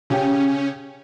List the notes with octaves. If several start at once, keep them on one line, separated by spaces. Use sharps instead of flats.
C#3 C#4 G4 G5